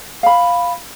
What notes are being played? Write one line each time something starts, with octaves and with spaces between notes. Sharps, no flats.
F5 B5